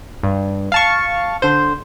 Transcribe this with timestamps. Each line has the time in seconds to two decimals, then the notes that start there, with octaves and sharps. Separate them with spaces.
0.23 G2
0.72 F5 A5 C#6
1.42 D3 C5